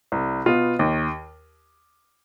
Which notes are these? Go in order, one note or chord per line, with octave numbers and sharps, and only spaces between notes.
C2
B2 B3 F4
D#2